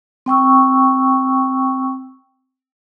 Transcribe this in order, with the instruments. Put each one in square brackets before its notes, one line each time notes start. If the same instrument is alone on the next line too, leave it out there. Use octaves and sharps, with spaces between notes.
[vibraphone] C4 G5 C#6 E6